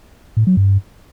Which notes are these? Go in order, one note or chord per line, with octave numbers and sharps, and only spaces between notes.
A2
F#3
G2